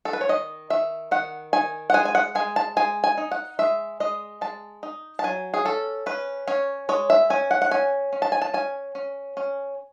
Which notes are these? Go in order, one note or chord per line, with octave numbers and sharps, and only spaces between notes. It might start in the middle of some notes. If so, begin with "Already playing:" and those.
A4
B4
C#5
D#3 D#5
D#3 E5
D#3 F#5
D#3 G#5
F#5
G#3 G#5
G#5
F#5
G#3 G#5
A5
G#3 G#5
G#5
D#4
F#5
G#3 E5
G#3 D#5
G#3 A5
D#4
A5
F#3 G#5
G#4
C#4 A4
C#4 B4
C#4 C#5
G#3 C#5
E5
C#4 G#5
F#5
F#5
C#4 G#5
C#4
A5
G#5
A5
C#4 G#5
C#4
C#4